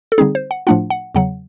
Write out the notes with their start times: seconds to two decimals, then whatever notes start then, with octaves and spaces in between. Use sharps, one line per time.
0.12 A4
0.18 D3 G3 C4 D#4 G#4
0.35 C5
0.51 F#5
0.67 A2 F3 A3 D4 F4 F#5
0.90 F#5
1.15 E2 C#3 F#3 F#5